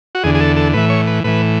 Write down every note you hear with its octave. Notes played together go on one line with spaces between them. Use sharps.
F#4
E2 D3 G#4
G#4
A4
A4
A2 E3 B4
C#5
B4
A2 E3 B4